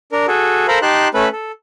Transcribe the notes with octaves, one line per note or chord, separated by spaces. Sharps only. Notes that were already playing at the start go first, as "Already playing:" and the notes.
D4 A#4
F#4 G#4 A4
A4 A#4 C5 F5 A#5 B5
D#4 G4 A5 C6 F#6
A3 C#4 A4 B4 B5
A4